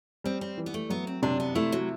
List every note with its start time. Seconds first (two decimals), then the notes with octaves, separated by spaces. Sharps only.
0.24 G3 C4
0.41 C4
0.58 E3
0.66 B3
0.74 A3
0.90 F#3 B3
1.07 C4
1.22 C3 D4
1.40 B3
1.55 A3 E4
1.72 F#3